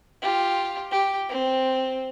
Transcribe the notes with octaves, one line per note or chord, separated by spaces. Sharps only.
F4 G4
G4
C4